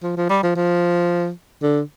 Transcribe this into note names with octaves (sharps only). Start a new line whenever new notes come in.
F3
F3
G3
F3
F3
D3